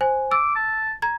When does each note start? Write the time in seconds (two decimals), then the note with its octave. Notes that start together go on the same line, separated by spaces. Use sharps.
0.01 C5 G#5
0.31 D6 E6
0.55 A5
1.02 A#5 G#6